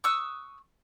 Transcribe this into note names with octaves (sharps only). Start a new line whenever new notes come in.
C#6 D#6 E6 F#6